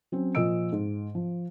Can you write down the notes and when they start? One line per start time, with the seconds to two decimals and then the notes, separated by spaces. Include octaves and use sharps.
0.12 F#3 C4 C#4
0.35 A#2 F3 D#5 E6 D7
0.72 G#2
1.15 F3